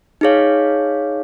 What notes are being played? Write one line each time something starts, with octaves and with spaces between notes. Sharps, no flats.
D#4 G#4 C#5 F5